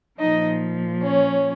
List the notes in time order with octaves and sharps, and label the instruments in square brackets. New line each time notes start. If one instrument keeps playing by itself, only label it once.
[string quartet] A#2 F3 D#4 D#5
C#4 C#5